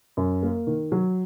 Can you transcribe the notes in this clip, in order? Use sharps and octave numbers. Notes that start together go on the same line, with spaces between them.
F#2
A#3
D#3
F#3